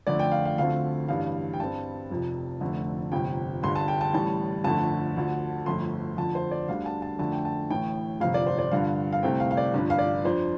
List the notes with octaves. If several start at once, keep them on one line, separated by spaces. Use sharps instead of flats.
F2 D3 A3 D5
G5
F5
F5
D2 D3 F3 A3 C4 F5
A1 G2 G3 D4 F5
G5
G2 G3 C4 A5
F1 F2 C3 F3
F1 F2 D3 A3
G1 F2 C3 G5
G1 G2 D3 G3 C6
A5
G5
A5
A1 A2 G3 A5
G1 F2 D3 A3 A5
D2 D3 F3
G1 F2 F3 A3 C6
F2 D3 F3 A5
C5
D5
D2 D3 G3 D4 F5
A5
A5
F2 D3 A3 D4 A5
G5
A5
A1 A2 A3 G5
G1 F2 C3 F3 F5
D5
C5
D5
G2 D3 F3 F5
F5
C2 C3 A3 C4 G5
F5
F5
D5
G1 G2 F3 D4
F5
D5
F2 F3 D4 C5